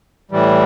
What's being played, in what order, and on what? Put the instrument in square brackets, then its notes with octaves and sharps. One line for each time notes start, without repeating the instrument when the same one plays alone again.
[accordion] A2 E3 G3